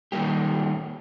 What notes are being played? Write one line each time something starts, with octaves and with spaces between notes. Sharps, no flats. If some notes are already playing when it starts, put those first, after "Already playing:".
D#3 G3 A3 A#3 G4